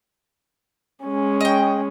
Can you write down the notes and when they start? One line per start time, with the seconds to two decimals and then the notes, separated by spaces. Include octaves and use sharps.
1.05 G#3 C#4
1.41 D#5 G5